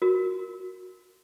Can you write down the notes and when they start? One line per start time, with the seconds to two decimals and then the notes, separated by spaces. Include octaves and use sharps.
0.02 F#4 A#4